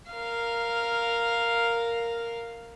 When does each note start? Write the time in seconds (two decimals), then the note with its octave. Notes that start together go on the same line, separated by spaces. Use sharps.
0.11 A#4 F5